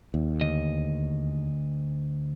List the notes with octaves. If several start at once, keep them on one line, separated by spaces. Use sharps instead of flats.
D#2
D2 D#5